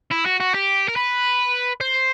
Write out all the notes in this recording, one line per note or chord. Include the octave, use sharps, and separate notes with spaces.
E4
F#4
F#4
G4
A#4
B4
C5